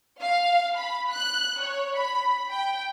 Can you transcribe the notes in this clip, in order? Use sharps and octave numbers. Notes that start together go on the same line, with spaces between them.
F5
B5
F#6
C#5
B5
G5